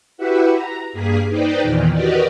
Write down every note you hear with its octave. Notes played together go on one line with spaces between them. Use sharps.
E4 F#4 G4 B4 E5 F#5
A#5
G2 A#3 G#4 B6
D#4 B4 C5 D5 G5
E2 A#2 D#3 E3
F#4 G4 A#4 B4 D5 D#5